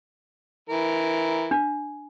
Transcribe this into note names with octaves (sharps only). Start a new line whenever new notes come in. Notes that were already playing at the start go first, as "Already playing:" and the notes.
E3 A#4
D4